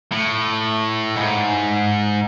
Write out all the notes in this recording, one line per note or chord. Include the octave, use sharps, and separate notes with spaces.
A2
G#2